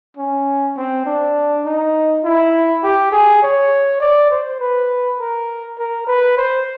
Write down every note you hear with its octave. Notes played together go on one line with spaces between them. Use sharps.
C#4
C4
D4
D#4
E4
G4
G#4
C#5
D5
C5
B4
A#4
A#4
B4
C5